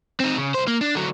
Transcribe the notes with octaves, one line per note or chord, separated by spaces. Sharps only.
C4 D#4
C#3
C2 C5
A#3
D4
D3 F#3